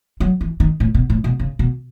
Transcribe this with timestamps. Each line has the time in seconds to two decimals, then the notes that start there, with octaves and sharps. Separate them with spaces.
0.20 F#3
0.41 E3
0.60 D#3
0.80 A2
0.94 B2
1.10 A2
1.24 B2
1.39 C#3
1.59 B2